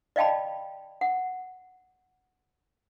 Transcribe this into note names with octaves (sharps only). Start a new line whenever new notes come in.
D5 D#5 F5 G5 A5 B5
F#5